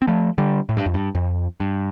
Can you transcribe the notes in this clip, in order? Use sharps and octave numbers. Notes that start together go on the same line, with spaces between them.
C4
F3 A3
D3 G3
A2
G2
F2
G2
F2
G2